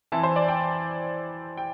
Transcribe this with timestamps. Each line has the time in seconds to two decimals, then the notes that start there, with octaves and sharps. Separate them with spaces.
0.12 E3 C4 E4 A5
0.23 C5
0.36 D5
0.48 G5
1.57 G5